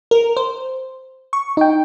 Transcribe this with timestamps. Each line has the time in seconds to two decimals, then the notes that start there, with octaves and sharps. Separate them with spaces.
0.11 A#4
0.37 C5
1.33 C#6
1.57 D#4 G5